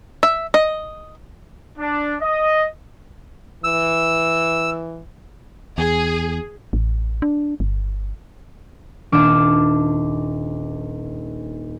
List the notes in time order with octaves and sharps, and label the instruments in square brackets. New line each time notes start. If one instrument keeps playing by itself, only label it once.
[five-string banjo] E5
D#5
[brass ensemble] D4
D#5
[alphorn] E3 [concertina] E6
[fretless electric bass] E2 [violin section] G#4
[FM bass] A1
D4
G1
[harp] D#1 D4 D6 F6 D7 E7